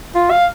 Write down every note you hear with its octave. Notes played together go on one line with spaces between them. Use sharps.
F4
F5